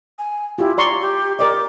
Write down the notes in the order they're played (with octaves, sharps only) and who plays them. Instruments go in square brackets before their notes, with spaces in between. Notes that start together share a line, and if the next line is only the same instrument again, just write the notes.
[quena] G#5
[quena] E4 [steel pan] F4 G4
[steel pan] D5 C6 C#6 [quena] A#5
[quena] G4
[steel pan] A#4 D5 D#5 [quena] D6